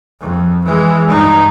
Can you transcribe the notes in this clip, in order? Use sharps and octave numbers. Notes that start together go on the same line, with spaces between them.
F2
E3 G#3
G2 D#4